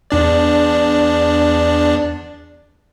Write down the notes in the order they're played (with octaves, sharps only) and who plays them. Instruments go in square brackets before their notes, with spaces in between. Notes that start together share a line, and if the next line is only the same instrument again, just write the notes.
[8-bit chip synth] E2 D4 D5